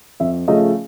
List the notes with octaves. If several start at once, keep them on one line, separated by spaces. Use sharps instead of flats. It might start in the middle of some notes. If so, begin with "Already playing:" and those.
F2 E5
C#3 F3 A3 C#4 D#5